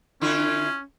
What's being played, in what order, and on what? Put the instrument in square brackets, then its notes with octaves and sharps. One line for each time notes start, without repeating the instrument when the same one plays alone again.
[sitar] D3 E4 F4 [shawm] C#4